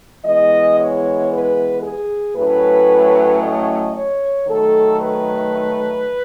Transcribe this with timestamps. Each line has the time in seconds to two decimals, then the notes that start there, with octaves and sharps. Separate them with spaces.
0.25 E3 G#3 B3 D#5
0.78 C#5
1.31 B4
1.83 G#4
2.36 A2 F#3 A3 C#4 B4
3.42 D#5
3.95 C#5
4.48 D#3 F#3 A3 A4
5.01 B4